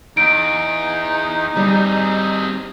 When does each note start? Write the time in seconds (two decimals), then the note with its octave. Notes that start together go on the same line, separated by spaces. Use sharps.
0.17 E2 D#4 D7
1.57 G3 C4 G#4